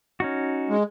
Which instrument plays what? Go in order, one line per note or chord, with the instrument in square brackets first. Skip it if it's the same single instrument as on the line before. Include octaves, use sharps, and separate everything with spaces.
[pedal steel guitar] C#4 D#4 F#4
[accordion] G#3